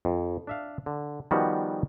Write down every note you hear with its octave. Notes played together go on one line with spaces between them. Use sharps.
F2
D4 E5 F5
D3
D#3 F3 G3 B3 C#4 F#4